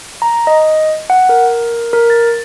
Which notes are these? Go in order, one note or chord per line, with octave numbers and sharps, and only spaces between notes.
A#5
D#5
F#5
A#4
A#4
A6